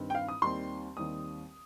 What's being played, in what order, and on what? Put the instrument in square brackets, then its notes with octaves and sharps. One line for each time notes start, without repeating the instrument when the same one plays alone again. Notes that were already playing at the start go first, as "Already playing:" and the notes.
Already playing: [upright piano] G2 D#3 C4
G5
F5
D#6
D#2 D#3 G3 C4 C6
D#2 D#3 G3 C4 D#6